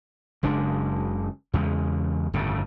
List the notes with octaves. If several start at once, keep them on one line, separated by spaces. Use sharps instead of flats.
F#1 C#3 G#3 D4
E2 C#3 G#3
G1 F2 A2 C#3